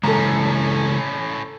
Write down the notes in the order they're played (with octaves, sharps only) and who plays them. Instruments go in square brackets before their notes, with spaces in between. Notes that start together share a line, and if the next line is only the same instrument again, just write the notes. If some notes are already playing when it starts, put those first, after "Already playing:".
[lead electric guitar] A2 C#4 [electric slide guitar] C#3 E3 G#3 [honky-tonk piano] A4 A#5